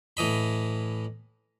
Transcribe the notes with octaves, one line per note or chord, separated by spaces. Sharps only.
A2 E3 D#5 B5